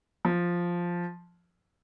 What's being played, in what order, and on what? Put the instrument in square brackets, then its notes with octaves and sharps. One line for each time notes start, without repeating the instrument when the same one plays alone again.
[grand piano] F3